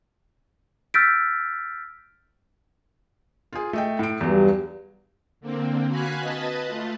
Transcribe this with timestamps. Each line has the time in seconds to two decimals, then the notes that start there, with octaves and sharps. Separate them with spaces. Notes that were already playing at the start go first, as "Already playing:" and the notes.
0.94 E6 F6 G6 A6 B6 D7
3.53 F4 G#4
3.73 A3 D#5 G5
3.99 A2 D7
4.21 E2 G2 F#3
5.41 D3 A#3 C4
5.89 F#4 F5 G#5 B5 F#6 G#6
6.21 B4 D#5 A5 B5
6.65 A3 F4